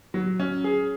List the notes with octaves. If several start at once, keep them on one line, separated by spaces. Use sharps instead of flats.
F#3
C#4
G#4